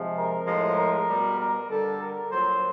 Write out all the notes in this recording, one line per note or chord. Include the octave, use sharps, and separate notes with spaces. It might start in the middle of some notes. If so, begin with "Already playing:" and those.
Already playing: C3 F3 G#3
A#4
A2 F3 G#3
A#4
B2 G3
A#4
D3 G3 A4
A#4
A#2 F#3 C5